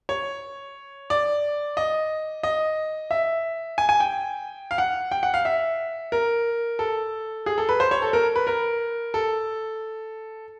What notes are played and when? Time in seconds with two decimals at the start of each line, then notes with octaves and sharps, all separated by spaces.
0.09 C#5
1.10 D5
1.77 D#5
2.43 D#5
3.11 E5
3.78 G#5
3.89 G#5
4.00 G5
4.71 F5
4.78 F#5
5.12 G5
5.23 F#5
5.34 F5
5.45 E5
6.12 A#4
6.79 A4
7.46 G#4
7.58 A4
7.69 B4
7.80 C5
7.91 C#5
8.02 A4
8.13 A#4
8.36 B4
8.47 A#4
9.14 A4